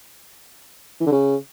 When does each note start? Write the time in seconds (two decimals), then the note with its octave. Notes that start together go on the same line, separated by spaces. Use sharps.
1.01 E3
1.06 D3
1.12 C#3